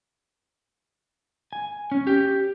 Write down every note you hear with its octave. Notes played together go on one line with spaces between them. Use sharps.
G#5
C#4
G4